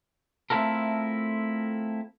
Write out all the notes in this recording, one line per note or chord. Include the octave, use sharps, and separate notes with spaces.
A3 C4 E4 F4 A4 A#4